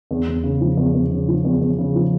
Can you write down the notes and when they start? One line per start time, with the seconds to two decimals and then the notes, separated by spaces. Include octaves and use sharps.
0.11 E2
0.28 E2
0.43 C#3
0.61 F3
0.77 E2
0.94 E2
1.11 C#3
1.28 F3
1.45 E2
1.61 E2
1.78 C#3
1.95 F3